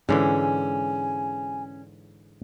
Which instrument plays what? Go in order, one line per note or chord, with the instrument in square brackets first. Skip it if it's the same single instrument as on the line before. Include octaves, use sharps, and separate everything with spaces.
[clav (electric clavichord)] G#2 D3 E3 [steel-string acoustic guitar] C#4 [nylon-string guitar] G#4 [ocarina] G#5